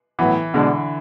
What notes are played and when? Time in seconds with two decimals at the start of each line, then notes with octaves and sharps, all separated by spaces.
0.19 A2 E3 F#3 B3
0.54 B2 D3 G#3 D4